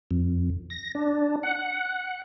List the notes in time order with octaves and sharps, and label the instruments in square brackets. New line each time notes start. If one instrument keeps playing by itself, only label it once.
[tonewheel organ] F2
A#6
D4
F#5